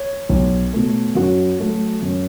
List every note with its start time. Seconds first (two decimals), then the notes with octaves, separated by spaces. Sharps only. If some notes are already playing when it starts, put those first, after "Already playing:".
Already playing: C#5
0.29 B1
0.73 B2 A3
1.15 F#2 F#4
1.59 F#3 A3
2.02 F#2